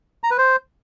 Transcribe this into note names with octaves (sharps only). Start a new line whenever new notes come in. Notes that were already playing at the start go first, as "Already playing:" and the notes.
A#5
B4
C5